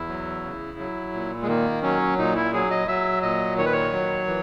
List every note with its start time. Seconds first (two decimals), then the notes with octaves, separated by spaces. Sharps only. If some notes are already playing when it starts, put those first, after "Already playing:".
Already playing: E2 E4
0.09 F#3
0.43 C#3
0.79 F#3
1.13 A#2
1.42 G#3
1.47 D#3 A#3
1.83 F#3 C#4
2.18 A#2 D#4
2.36 E4
2.53 F#3 G#4
2.71 D#5
2.88 F#3 E5
3.22 A#2 D#5
3.58 D#3 C#5
3.66 B4
3.72 C#5
3.92 F#3
4.27 E3